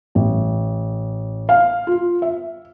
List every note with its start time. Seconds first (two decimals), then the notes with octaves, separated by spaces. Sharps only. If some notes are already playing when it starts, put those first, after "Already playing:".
0.15 A1
1.49 F5
1.87 F4
2.22 E5